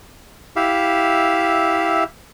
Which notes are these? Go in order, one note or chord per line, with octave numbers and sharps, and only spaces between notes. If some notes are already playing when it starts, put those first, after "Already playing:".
E4 G4 E5 F5